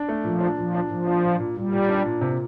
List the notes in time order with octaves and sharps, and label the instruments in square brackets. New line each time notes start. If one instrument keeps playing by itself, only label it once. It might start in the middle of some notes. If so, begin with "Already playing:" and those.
Already playing: [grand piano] D4
A3
[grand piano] A#2 [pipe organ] F3
[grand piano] D4
[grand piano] A#2 [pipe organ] F3
[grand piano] D4
[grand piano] A#2 [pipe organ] F3
[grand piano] D4
A#2
A#2
[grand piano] A#2 [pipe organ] G3
[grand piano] A#2
D4
A#2
C3